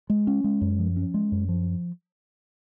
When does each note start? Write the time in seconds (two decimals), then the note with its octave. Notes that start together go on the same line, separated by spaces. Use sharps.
0.10 G#3
0.27 C#4
0.44 G#3
0.61 F#2
0.79 F3
0.97 C#4
1.14 G#3
1.32 F#2
1.49 F3